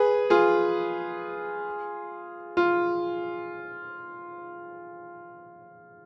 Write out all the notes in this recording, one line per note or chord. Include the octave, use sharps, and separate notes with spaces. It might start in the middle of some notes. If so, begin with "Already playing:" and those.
Already playing: G#4 B4
F4 G#4
F4